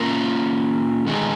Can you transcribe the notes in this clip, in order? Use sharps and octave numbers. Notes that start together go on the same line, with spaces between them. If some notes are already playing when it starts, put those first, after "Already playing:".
Already playing: A#3 C#4 F4 A#4
D#3 G#3 B3 D#4 G#4